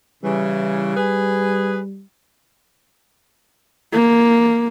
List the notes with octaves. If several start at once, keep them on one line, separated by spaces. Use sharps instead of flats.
C#3 E3 G3
G#4 B4
A#3